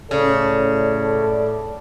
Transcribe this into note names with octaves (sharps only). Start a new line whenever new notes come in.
A2 C#3 A4 D5